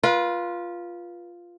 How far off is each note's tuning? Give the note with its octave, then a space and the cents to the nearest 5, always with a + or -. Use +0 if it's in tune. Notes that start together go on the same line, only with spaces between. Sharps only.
F4 +0 B4 -30